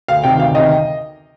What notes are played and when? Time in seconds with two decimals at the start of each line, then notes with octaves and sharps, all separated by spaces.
0.08 D2 F5
0.24 C3 D#3 G5
0.39 D2 F5
0.54 C3 D#3 D#5